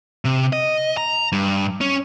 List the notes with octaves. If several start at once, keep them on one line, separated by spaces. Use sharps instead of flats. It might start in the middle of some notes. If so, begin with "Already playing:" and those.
C3
D#5
A#5
G2
C#4